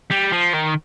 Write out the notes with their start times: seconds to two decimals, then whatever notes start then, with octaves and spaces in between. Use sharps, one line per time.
0.11 G3
0.32 F3
0.54 D#3